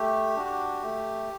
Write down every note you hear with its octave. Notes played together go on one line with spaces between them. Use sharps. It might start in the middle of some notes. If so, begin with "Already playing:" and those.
Already playing: A3 G4
D4 F#4
A3